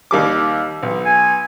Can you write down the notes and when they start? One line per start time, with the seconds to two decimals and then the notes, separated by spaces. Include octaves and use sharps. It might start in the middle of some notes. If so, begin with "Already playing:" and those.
0.11 D#2 G3 D6
0.83 B1
1.06 G#5